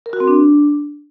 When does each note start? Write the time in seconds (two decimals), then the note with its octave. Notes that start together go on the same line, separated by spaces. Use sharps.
0.06 A#4
0.13 F#4
0.20 C4
0.28 D4